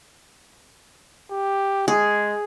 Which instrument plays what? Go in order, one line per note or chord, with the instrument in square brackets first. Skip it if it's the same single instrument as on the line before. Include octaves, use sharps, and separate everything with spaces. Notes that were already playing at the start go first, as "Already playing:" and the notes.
[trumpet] G4
[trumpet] G#3 [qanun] G#4